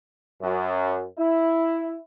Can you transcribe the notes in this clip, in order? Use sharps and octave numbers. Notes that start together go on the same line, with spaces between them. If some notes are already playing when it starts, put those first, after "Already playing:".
F#2
E4